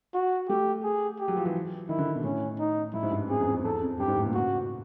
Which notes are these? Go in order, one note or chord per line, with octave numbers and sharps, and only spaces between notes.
F#4
A3 G4
G#4
G4
F#3
F3
E3
D#3 E4
D3
B2
A2 C#4
D#4
A2 E4
G#2
G2
F#2
F2 G#4
E2
F2
F#2
E2 A4
F2
G2 G4
G#2
A2
A#2
C#3 F#4